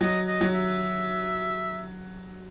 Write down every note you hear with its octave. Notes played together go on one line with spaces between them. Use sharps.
F#3 D#5
D#5
F#3
E5